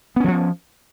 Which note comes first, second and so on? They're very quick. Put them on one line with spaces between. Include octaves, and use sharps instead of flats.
B3 C#4 E3 F3